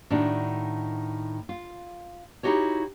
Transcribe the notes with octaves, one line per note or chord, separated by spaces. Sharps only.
A2 D#3 D4 F#4
F4
D#4 E4 F#4 G4 C#5